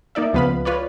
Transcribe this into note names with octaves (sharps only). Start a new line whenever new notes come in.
A#3 D#4 D5 E5
C#2 F3 B3 B4 F5 B5
F4 B4 C#5 D5